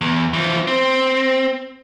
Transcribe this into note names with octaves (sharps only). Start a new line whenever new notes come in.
E2
E3 F3
C4